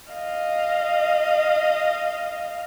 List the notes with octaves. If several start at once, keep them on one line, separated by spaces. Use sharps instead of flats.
D#5 F5